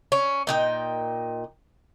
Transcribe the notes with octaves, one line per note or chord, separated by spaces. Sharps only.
C#4
A#2 D#4 G5